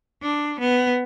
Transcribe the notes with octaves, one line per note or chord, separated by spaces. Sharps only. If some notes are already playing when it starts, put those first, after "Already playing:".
D4
B3